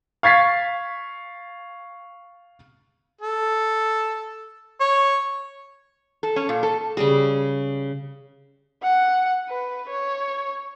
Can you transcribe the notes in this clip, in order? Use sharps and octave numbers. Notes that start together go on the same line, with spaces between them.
F5 C#6 G#6 A6 B6 C7
A4
C#5
A4
C#4
A#2
A4
C#3 G3 G#4
F#5
B4
C#5